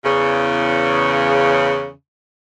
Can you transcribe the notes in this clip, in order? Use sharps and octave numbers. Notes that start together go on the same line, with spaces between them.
E2 C#3